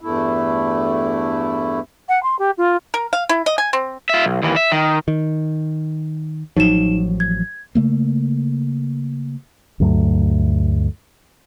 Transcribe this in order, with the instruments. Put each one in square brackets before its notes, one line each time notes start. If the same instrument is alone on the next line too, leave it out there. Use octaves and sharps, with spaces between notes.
[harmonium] E2 G2 A3 E4
[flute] F#5
C6
G4
F4
[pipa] A#4
F5
E4
D#5
G#5
C4
[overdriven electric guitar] F4 E5
B1
D#2 E3
E5
D#3
[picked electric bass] D#3
[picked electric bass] A1 F3 F#3 [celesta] D#4 E7
[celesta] G#6
[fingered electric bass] C#3 A3 A#3
D2 G2 F#3 A3